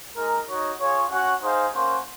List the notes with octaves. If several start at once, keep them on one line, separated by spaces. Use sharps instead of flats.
G#3 D#4 A#4
D#4 F#4 C#5
F4 G#4 C#5
C#4 F#4 C#5 F#5
D#4 G#4 C5 F5
A#3 C#4 F#4 C5 F#5